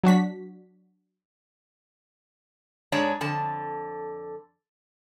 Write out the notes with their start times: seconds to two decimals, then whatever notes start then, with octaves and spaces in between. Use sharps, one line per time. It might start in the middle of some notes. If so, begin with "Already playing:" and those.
0.04 F#3 D4 F#4 B6
2.92 G#2 G#3 D4 C#5 A5
3.21 F2 D3 A5